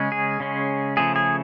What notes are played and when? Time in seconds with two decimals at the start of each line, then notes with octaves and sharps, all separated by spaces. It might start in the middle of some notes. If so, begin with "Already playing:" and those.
Already playing: C#3 G#3 C#4
0.12 G#4
0.40 C#3 G#3 C#4
0.97 C#3 F3 A3 C#4 G#4
1.16 G#4